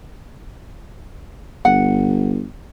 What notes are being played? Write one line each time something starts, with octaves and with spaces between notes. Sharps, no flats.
G1 F#5